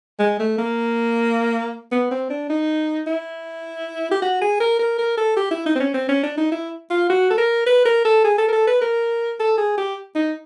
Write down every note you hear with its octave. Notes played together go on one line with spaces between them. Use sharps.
G#3
A3
A#3
B3
C4
D4
D#4
E4
G4
F#4
G#4
A#4
A#4
A#4
A4
G4
E4
D#4
C4
C#4
C4
C#4
D4
D#4
E4
F4
F#4
A4
A#4
B4
A#4
A4
G#4
A4
A#4
A4
B4
A#4
A4
G#4
G4
D#4